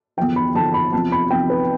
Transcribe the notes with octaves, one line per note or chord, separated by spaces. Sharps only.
E2 D3 F3 G5
B5
E2 D3 F3 A5
B5
E2 C3 F3 A5
B5
E2 C3 F3 G5
B4